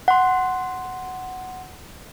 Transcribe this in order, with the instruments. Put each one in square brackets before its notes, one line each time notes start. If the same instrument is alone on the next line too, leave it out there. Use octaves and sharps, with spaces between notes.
[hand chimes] F#5 C6